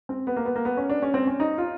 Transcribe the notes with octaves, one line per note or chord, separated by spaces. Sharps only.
C4
B3
A#3
B3
A#3
B3
C#4
D4
C#4
C4
C#4
D#4
F4